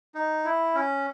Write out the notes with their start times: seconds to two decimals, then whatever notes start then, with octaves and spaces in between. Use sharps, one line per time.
0.15 D#4
0.45 E4
0.75 C#4